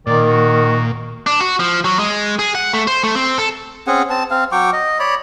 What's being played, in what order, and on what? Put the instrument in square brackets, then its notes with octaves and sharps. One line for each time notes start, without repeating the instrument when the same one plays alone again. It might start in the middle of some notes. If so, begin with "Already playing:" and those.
[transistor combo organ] A#2 [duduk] D#3 [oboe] D5
[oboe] F#4
[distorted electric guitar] D4
F#4
F3
F#3
G#3
G#4
F#5
A3
C5
A3
C4
A4
[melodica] C4 C#4 G#4 F#5
C4 A5
C4 F5
F#3 G5 C#6 D6
D#5
C#5 D5 B5